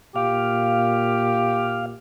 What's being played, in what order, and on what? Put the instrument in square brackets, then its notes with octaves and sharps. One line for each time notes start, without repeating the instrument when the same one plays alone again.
[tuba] A#2 [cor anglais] G4 [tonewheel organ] F5